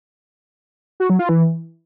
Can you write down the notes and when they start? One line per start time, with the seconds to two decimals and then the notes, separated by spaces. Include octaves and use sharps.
1.00 F#4
1.10 F#3
1.19 F4
1.29 E3